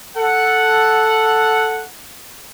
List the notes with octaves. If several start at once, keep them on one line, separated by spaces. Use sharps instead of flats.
A4 F#5